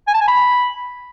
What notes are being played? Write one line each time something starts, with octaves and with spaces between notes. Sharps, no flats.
G#5
A5
G#5
B5